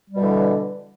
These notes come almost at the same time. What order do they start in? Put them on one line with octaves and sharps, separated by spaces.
G3 B2 D3 E3